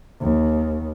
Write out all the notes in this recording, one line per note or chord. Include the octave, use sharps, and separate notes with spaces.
D#2